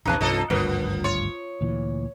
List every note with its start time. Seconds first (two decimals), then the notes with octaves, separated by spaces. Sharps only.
0.05 A#1 E2 C3 D#4 B4 A5
0.21 C2 G2 F3 A4 D#5
0.50 G#1 D2 G2 F3 B3 A#4 B4
1.04 F4 C#5
1.61 D2 A#2 E3